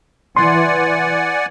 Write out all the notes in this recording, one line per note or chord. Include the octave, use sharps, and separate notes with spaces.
E3 D5 F#5 G#5 C6